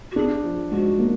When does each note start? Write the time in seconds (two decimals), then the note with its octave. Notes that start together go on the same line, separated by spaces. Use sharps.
0.11 F#4
0.16 D4 G#4
0.44 F3
0.71 G#2 F#4
0.99 A#3